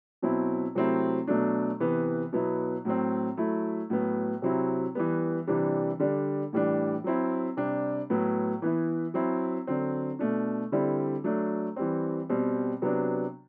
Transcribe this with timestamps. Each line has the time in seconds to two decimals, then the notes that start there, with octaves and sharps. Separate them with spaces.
0.22 B2 F#3 C4 E4
0.75 C3 F#3 A3 C4 E4
1.27 B2 F#3 A3 D4
1.80 C3 E3 B3
2.33 B2 F#3 B3 E4
2.85 A2 F#3 C4
3.37 F#3 A3 E4
3.90 A2 F#3 B3
4.42 C3 F#3 C4 E4
4.95 E3 G3 B3
5.47 C3 E3 G3 D4
5.99 D3 G3 D4
6.53 A2 E3 G3 D4
7.04 F#3 C4 E4
7.57 C3 G3 D4
8.10 A2 F#3 B3
8.62 E3 B3 E4
9.14 F#3 C4 E4
9.67 D3 F#3 C4
10.19 B2 A3 D4
10.72 D3 G3 C4 E4
11.24 F#3 A3 D4
11.76 E3 G3 C4
12.29 B2 G3 C4
12.82 C3 F#3 B3 D4